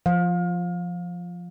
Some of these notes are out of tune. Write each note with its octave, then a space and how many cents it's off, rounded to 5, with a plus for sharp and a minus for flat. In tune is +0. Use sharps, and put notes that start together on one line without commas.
F3 +0 F5 +30